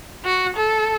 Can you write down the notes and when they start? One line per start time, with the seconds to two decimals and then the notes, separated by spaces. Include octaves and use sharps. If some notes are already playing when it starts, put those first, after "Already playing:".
0.25 F#4
0.56 A4